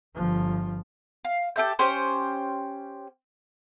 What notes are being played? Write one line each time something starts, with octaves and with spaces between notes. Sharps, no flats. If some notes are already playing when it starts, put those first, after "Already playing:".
G1 F3
F5
G4 A4 E5 G6
C#4 G4 C5